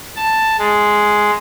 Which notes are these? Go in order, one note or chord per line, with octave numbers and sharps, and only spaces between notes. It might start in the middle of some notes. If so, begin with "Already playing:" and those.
A5
G#3